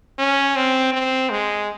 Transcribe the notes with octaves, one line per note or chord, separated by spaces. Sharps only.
C#4
C4
C4
G#3